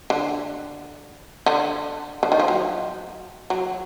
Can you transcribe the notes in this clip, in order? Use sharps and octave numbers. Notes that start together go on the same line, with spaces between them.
D3
D3
D3
D#3
F3
F#3
F#3